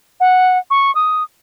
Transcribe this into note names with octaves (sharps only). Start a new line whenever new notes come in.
F#5
C#6
D#6